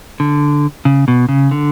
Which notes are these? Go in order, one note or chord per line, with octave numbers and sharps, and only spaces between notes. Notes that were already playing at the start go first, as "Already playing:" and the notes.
D3
C#3
B2
C#3
D3